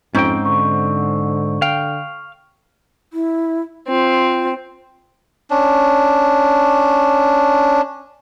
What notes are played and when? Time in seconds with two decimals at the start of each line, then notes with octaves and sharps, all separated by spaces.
0.15 F2 G#2 C4 C#4 D#4 G5
0.45 D3 C#6
1.62 F5 G5
3.13 E4
3.88 C4 F4
5.50 C#4 D4